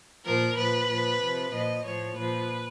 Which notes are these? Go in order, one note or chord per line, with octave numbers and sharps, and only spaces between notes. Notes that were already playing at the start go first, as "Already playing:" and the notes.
A#2 F3 A#4
A#2 F3 B4
A#2 F3
C3 F3
A#2 F3 D#5
A2 F3 C#5
A#2 F3 B4